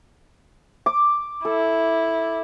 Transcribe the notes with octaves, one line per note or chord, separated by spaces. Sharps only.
D6
E4 A4